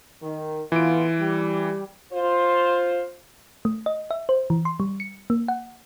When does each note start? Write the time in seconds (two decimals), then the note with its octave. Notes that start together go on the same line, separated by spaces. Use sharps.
0.21 D#3
0.72 A2 E3 B3 F4 D7
1.19 G3 G4
2.12 F4 C5
3.65 A3
3.86 D#5
4.11 E5
4.29 C5
4.50 E3
4.65 C6
4.80 G3
5.00 C#7
5.30 A#3
5.48 F#5